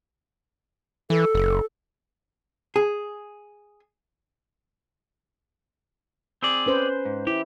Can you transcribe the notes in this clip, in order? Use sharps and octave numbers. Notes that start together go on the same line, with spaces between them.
E3 A4
F#1
G#4
C4 G#4 D5
C#4 B4 C5
G#2
E4 G4